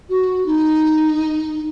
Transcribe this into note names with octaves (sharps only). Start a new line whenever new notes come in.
F#4
D#4